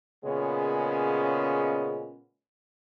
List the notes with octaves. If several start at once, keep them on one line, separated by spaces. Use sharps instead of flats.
A#2 C#3 G#3 B3 C#4